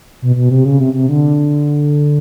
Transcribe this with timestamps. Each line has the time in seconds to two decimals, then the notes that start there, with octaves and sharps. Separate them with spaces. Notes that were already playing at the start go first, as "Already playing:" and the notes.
0.22 B2
0.36 B2
0.51 C3
0.65 C#3
0.80 C3
0.93 C3
1.09 D3